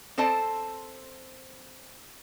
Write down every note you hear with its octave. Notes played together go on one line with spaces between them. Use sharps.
C4 A4 C5 D5 A5